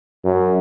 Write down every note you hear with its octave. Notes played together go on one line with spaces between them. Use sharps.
F#2